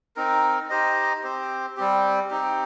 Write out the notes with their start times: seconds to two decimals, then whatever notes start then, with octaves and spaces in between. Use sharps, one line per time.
0.16 C4 D#4 A#4
0.70 D#4 G4 C5 D#5
1.23 C4 G4 C5
1.77 G3 C4 G4
2.30 C4 D#4 G4